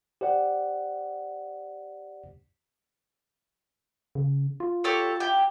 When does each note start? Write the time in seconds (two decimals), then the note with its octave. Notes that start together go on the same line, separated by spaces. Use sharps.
0.21 G4 C5 D5 F#5
4.15 C#3
4.60 F4
4.84 G4 A4 C#5
5.20 E4 G4 G5